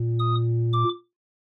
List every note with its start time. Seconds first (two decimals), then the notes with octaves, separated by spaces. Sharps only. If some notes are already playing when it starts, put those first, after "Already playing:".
Already playing: A#2
0.19 D#6
0.73 D6